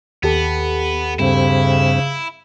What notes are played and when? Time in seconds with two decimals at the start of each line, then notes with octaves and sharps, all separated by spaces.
0.23 D#2 B3 G4 A4
1.19 G2 C#3 C4 E4